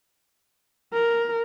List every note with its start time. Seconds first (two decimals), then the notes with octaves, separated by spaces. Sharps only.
0.93 A#4